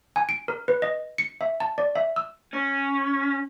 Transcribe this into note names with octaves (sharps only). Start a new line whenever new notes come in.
G#5
D7
A#4
B4
D#5
C#7
E5
A5
D5
E5
E6
C#4